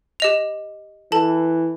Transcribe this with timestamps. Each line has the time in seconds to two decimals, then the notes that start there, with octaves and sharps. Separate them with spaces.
0.20 G4 D#5 F7
1.12 E3 A4 A5